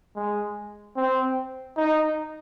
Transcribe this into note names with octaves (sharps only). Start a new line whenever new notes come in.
G#3
C4
D#4